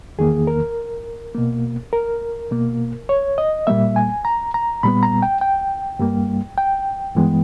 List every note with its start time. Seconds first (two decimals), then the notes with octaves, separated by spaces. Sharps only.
0.19 E2 D#3 A#3 G#4
0.47 A#4
1.35 B2 A#3
1.93 A#4
2.51 B2 A#3
3.09 C#5
3.38 D#5
3.67 A#2 G3 A#3 E5
3.96 G#5
4.25 A#5
4.54 A#5
4.83 A#2 G3 B3 B5
5.03 A#5
5.22 G5
5.41 G5
5.99 G2 G3 A#3
6.58 G5
7.15 G2 E3 G#3 B3